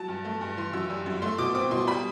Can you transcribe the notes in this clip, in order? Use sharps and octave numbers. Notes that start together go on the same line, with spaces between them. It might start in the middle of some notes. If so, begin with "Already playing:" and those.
Already playing: F#3 A5
G2
A3
G2
E3 C6
F#2 E6
G3
F#2
A3 C6
B2 D6
C4 D6
B2 C6
G3 B5